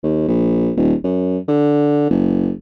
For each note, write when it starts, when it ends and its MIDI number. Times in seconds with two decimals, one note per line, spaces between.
0.03 0.23 39
0.28 0.71 34
0.76 0.94 27
1.04 1.38 42
1.48 2.06 50
2.10 2.51 30